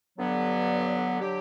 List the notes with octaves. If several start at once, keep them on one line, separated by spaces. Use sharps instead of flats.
G2 D3 F#3 B3
D3 F#3 G4